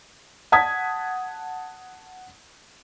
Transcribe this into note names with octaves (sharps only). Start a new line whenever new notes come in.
F#5 A5 D#6 G#6 B6